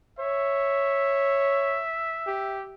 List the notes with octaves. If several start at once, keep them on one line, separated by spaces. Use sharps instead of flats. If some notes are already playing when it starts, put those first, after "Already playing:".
C#5 E5
G4